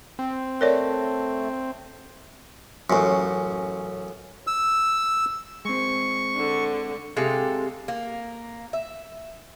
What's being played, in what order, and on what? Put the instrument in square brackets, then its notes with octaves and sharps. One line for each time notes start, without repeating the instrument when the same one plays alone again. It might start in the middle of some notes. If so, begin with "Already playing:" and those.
[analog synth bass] C4
[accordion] A3 [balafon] A#4 C#5 D5
[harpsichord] A1 F#2
[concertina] E6
[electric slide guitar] G#3 C4 [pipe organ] C#6
[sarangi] D3
[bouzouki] C3 G#3 A4 F5
A#3
E5